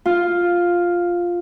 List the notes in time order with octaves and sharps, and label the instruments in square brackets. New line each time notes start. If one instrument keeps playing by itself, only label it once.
[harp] F4